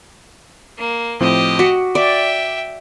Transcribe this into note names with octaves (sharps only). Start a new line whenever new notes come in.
A#3
A2 F3 C4 G4 D#5
F#4 D6 B6 C#7
D5 E5 G5